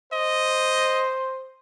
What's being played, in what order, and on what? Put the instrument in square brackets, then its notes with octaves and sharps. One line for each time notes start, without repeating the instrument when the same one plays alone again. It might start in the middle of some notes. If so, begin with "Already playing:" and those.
[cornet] C5 [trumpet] D#5